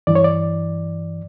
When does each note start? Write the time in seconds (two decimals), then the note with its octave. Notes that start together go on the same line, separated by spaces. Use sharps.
0.07 G2 E3 D5
0.15 C#5
0.24 D5